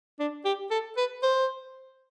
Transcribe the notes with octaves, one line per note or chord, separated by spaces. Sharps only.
D4
G4
A4
B4
C5